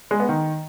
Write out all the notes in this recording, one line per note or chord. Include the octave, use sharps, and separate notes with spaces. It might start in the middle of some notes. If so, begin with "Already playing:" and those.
G#3
B3
D#3